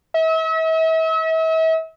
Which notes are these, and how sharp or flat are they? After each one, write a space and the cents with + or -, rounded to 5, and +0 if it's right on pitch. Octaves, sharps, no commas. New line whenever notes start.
E5 -40